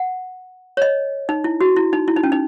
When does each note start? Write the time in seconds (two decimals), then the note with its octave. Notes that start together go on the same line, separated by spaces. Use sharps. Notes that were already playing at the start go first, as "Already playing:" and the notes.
Already playing: F#5
0.77 C#5
0.82 D#5
1.29 D#4
1.44 E4
1.61 F#4
1.76 E4
1.93 D#4
2.08 E4
2.16 D#4
2.23 C#4
2.32 D#4